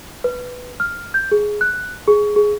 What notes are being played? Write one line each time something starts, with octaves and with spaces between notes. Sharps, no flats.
B4
F6
G6
G#4
F#6
G#4
G#4